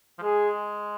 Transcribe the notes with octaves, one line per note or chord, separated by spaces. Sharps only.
F3
G#3 G#4